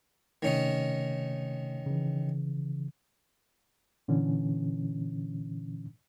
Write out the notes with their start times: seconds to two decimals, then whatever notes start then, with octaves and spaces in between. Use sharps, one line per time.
0.42 C3 D#3 A3 C#4 D#4
1.86 C#3 E3
4.08 A#2 D3 E3 C#4